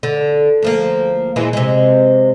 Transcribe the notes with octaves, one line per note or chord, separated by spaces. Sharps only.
D3
D2 F3 A#3
A#2 E3 G#3
C3 G#3